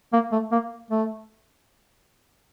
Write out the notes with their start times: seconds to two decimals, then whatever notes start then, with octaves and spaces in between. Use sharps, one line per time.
0.13 A#3
0.32 A3
0.52 A#3
0.91 A3